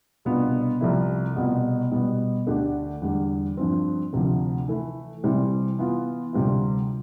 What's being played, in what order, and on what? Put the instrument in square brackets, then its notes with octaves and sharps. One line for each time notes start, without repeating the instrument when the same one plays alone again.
[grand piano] C2 B2 B3 D4 F4
C2 C3 F3 A3 E4
C2 B2 B3 F4
B2 G3 B3
D2 D3 A3 D4 G4
E2 D3 G3
G2 F3 C4
D2 C3 F3
E3 A3 E4
C3 E3 G3 C4 E4
E3 B3 F4
D2 C3 G3 C4 F4